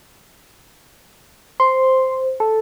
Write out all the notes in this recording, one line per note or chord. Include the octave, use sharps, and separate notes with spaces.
C5 C6
A4